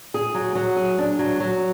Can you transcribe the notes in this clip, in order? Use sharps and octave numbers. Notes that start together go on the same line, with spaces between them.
G#4
F#3
F#3
G#4
D4
F#3
F#3